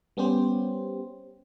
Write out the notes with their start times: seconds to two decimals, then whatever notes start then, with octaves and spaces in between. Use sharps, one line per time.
0.17 G3 B3 C#4 G4 C5